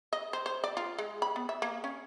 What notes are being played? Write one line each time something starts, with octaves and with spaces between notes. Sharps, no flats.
D#5
C5
C5
D5
F4
G#3
B5
B3
E5
A#3
C#4